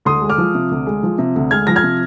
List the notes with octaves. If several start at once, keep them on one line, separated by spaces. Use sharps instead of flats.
D2 C6 D#6
G#3
D6 F6
F3
C3
D2
G#3
F3
C3
D2
G#3 F6 G#6
F3 A#6
F6 G#6
C3